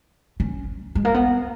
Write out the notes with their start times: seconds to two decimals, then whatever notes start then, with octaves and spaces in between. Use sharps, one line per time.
0.40 C#4
0.95 G#3
1.05 A#3
1.14 B3